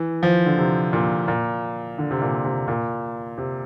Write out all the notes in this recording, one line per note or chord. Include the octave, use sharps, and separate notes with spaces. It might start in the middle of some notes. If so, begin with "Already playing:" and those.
Already playing: E3
F3
D3
C3
A#2
A#2
D3
C3
A#2
C3
A#2
C3